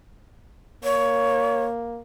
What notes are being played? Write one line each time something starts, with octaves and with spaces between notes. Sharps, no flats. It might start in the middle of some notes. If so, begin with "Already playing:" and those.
A#3 C#5